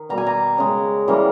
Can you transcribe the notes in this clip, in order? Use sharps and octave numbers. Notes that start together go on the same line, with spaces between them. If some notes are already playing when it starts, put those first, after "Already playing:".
Already playing: D#3
B2 G3 A#3 A#5
G#5
A#5
C#3 G#3
C#3 E3 G3 A#3